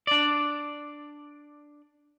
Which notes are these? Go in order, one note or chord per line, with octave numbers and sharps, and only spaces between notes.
D4 D5